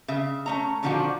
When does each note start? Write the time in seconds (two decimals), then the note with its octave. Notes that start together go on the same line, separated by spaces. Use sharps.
0.08 C#3 E5
0.46 A3 C#4 A#5
0.83 A#2 D3 D#3 F3 D4 F#4